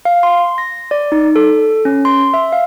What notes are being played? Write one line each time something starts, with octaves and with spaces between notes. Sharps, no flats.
F5
C6
A#6
D5
D#4
A4
C#4
C6
E5
F5